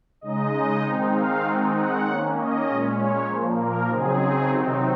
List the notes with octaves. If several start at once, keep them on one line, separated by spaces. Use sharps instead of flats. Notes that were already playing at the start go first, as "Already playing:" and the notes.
C#3 G#3 D#4 D#5
D#3 G#3 C4 D#4
F5
D#3 G#3 C4 D#4 F#5
F#5
D#3 A#3 C#4 F#5
D#5
A#2 G#3 C#4 D#5
C#5
A#2 F3 A#3 C5
A#4
C#3 F#3 C4 D#4 G#4
C3 D#3 F#3 C4 D#4